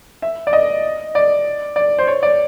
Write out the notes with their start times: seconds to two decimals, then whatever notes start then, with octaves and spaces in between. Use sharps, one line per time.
0.22 E5
0.47 D5
0.53 D#5
1.15 D5
1.76 D5
1.98 C5
2.07 C#5
2.23 D5